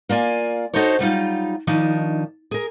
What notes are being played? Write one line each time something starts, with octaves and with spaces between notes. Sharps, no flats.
A#3 F4 D5 G#5
D4 D#4 F#4 A4 C5 C#5
F#3 G3 D#4 F4
D#3 F3 D4 D#4
G#4 A#4